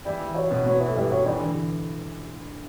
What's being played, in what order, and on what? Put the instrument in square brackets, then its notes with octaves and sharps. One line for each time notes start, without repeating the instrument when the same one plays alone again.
[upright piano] E3 E4 [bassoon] G3
[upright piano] E3 E4
[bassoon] F#3
[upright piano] B2 B3
[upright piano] B2 B3 [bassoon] F#3
[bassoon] E3
[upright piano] A3
[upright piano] G2 G3 [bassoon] E3
[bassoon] F#3
[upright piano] E3 [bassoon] G3
[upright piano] D3
E3